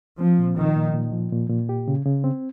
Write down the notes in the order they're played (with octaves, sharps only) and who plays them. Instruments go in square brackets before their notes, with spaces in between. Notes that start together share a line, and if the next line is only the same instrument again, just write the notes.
[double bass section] F3 [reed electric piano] C4
[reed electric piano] A#2
[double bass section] D#3 [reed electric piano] F3
[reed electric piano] A#2
A#2
F3
A#2
A#2
G4
C#3
C#3
C4